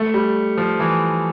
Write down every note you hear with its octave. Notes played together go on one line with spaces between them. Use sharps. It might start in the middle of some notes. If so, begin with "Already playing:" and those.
Already playing: A3
G3
F3
E3